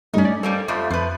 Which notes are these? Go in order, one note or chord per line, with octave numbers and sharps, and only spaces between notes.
G2 G3 A3 C#4 D#4
D5
G3 A#3 C4 A4
F2 F3 A3
F2 F3 B4